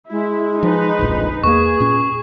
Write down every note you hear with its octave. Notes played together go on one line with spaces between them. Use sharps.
G#3 E4
F3 D#4 B4
D1 A#1 F2
E2 A#3 G#4 B4 C#6
A#2 C#4